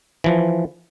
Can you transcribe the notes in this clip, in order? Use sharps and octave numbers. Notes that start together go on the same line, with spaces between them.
E3 F3